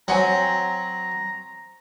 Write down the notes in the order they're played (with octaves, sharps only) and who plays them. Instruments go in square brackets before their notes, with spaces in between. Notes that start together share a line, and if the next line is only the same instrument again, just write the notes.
[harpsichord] F#3 [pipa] C4 F#5 G#5 [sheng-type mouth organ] A#5